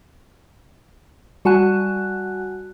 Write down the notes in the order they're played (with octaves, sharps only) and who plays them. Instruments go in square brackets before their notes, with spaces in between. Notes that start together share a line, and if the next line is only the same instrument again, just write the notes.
[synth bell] G3 F#4 F#5 G#5 A5 F#6